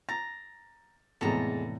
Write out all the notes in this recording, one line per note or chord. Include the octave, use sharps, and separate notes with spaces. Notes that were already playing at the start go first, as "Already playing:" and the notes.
A#5 A6
F1 E2 A2 E3 G#3 A4 A#5